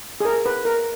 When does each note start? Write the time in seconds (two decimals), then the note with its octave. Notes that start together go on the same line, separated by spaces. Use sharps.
0.20 G#4
0.25 A#4
0.46 B4
0.65 A#4